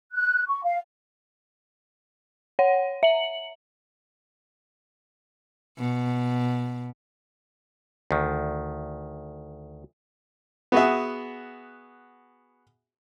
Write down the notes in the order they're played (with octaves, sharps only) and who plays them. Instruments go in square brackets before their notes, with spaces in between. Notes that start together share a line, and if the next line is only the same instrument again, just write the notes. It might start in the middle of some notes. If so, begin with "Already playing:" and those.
[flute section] F#6
C#6
F5
[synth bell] C#5 F#5
E5 F#7
[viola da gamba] B2
[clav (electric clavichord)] D2 D#3
[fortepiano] B3 F#4 G#4 E5